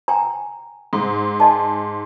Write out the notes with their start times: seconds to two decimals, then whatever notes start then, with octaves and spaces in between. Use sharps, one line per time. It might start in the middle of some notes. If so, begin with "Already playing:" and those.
0.08 G5 G#5 A#5
0.93 G#2
1.40 D#5 G#5 A5